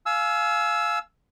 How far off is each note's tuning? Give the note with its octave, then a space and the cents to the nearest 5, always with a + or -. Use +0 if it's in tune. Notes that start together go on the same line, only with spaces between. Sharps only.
F5 +0 G#5 +35 E6 +0